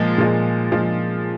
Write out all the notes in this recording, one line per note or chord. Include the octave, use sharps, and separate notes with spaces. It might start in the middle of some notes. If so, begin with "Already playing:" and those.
Already playing: A#2 F3 G#3
A#2 F3 G#3
A#2 F3 G#3